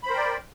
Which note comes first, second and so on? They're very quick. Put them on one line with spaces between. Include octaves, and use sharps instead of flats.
B5 C5 A#4 G5 D5